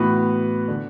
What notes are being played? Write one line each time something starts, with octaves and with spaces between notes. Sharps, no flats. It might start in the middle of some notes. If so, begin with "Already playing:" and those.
Already playing: A2 E3 B3 F#4 B4
D3